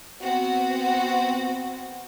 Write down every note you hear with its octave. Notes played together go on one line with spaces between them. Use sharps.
B3 C4 F#4